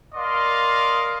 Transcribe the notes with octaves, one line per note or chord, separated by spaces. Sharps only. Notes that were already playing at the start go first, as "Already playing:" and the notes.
A#4 D5 D#5 F5 C6